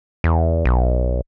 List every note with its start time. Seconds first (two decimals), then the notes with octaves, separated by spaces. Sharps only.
0.24 E2
0.65 B1